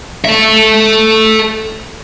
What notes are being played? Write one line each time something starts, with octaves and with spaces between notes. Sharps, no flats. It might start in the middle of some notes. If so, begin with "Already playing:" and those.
A4 E5